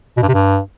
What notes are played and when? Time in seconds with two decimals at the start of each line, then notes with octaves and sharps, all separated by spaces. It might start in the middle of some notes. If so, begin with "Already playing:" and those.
0.17 B2
0.22 G2
0.28 C3
0.34 G2